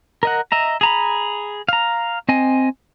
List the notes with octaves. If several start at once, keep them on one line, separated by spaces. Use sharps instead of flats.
A#4 D#5 F#5
D#5 E5 A#5
G#4 A#5 B5
F5 A#5
C4 D#5 G#5